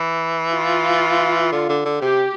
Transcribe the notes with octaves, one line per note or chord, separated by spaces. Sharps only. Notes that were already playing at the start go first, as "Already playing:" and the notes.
Already playing: E3
F4
D3
D3
D3
C3 G4